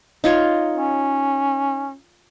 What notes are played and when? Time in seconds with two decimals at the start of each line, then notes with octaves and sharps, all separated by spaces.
0.24 D#4 F4 C#5
0.75 C#4